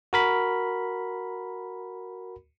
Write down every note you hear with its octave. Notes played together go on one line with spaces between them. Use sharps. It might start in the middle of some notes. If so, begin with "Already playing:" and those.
F#4 A#4 B5